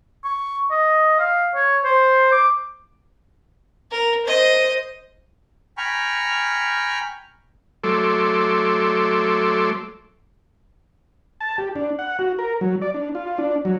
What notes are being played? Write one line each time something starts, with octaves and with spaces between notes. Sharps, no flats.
C#6
D#5
F5
C#5
C5
D6
A#4
C5 D#5
G5 G#5 A#5 B5 C#6 F6
F#3 A3 A4 C6 D6
A5
G4
D4
F#5
F#4
A#4
F#3
D5
D4
F4
D4
F#3